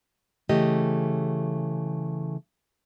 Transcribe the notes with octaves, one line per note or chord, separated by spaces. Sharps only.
C#3 E3 A3 G4 D#5